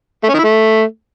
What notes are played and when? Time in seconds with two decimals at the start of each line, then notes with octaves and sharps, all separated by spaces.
0.24 A3
0.29 C#4
0.34 D#3
0.39 E4
0.44 A3